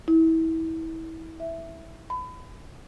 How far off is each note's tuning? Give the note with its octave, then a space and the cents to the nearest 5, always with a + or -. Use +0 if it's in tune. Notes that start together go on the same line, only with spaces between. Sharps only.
E4 -30
E5 +5
B5 +30